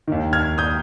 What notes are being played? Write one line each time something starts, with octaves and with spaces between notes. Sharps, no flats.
D#2 D#3
F6 G#6
D#6 G6